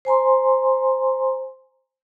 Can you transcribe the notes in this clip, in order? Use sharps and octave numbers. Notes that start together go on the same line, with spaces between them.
C5 G#5 A#5 C6